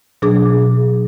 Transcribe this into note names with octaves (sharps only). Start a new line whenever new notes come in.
B2 F#3 D4 G#4 D6